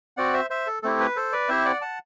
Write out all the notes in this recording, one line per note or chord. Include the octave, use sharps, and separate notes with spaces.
C4 F#4 D5 F#5
C5 E5
C5 E5
A4
A3 C4 E4 G4 A4
B4
A4 C5
B4 D5
C4 E4 G4 C5 E5
D5 F#5
F#5 A5